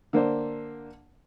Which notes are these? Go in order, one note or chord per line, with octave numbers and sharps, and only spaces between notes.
D3 A#3 D4 C5